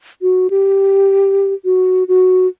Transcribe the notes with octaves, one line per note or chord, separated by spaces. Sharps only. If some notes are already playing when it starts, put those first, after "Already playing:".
F#4
G4
F#4
F#4